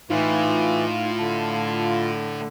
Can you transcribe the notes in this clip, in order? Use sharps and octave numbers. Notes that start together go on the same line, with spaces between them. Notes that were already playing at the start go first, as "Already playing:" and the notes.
A2 E3 D#4 F4
D3 A5